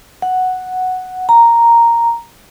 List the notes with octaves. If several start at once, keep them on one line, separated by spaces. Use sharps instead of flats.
F#5
A#5